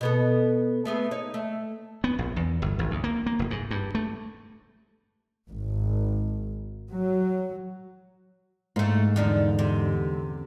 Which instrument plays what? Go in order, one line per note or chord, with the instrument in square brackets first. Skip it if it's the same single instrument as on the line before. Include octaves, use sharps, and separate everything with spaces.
[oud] B2 B3 A4
A3 B3 G#4
D#4 C#5
A3
[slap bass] B3
A#1
E2
G1
G#1
D2
A#3
A#3
F1
G#2
G2
A3
[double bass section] G#1
F#3
[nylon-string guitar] G#2 [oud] A3 A#3
[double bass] E2 D3 [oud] F3 D4 D#4
[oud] C3